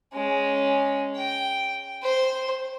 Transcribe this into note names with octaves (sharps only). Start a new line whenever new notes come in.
G#3 C#4
G5
C5